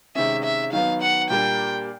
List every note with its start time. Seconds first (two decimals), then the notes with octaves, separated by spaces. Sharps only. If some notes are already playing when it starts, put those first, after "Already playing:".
0.15 C3 D#3 G#3 C#4 E5
0.44 E5
0.73 D#3 F#3 B3 F5
1.02 F#5
1.30 A#2 G3 A#3 D4 G5